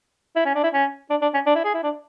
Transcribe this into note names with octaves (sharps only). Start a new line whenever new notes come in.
E4
C#4
D4
E4
C#4
D4
D4
C#4
D4
E4
G#4
E4
D4